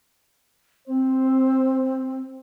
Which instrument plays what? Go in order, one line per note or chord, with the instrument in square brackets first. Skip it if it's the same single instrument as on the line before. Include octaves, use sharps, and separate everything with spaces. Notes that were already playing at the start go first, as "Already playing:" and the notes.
[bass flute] C4 [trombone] C5